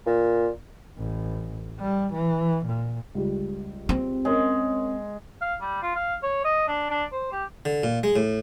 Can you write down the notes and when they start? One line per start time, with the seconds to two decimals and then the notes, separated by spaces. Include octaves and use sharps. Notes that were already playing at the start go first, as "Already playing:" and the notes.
0.06 A#2
0.98 A1
1.79 G3
2.13 E3
2.66 A#2
3.15 C#2 G3
3.89 C4
4.25 G#3 C#4 A#4 C#5
5.41 F5
5.61 G3
5.82 F4
5.95 F5
6.23 C#5
6.44 D#5
6.68 D4
6.90 D4
7.12 C5
7.32 G4
7.65 D3
7.83 A#2
8.03 G#3
8.16 A2